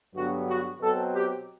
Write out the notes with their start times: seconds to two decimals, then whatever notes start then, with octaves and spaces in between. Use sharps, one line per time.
0.14 G2 D3 F#3 B3 F#4
0.47 F#4
0.80 B2 F#3 C4 A4
1.13 G4